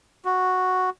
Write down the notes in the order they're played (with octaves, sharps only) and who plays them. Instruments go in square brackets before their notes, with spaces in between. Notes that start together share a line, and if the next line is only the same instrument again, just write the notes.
[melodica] F#4